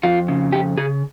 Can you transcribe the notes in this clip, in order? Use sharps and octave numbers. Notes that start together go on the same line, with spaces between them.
F2 F4
C#3
F2 G4
C#3 G#4